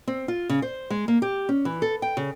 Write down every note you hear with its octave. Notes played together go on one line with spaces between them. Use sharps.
C4
F4
C#3
C5
G#3
A#3
G4
C#4
E3
A4
G5
C#3